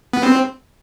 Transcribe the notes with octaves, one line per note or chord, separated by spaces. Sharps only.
B3
C4